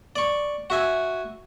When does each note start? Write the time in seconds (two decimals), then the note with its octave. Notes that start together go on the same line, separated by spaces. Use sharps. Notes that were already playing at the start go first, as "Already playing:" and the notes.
0.16 D5 C#6
0.70 F#4 E5 G#5